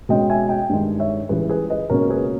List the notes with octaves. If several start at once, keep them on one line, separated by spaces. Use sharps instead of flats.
B2 G#3 C#4 D#5 G5
E5 G#5
D#5 G5
G2 D#3 G#3
C#5 E5
C#2 C#3 E3 G3 G#4 B4
G#4 B4
B4 D#5
C#2 B2 A#3 C#4 A#4 C#5
G#4 B4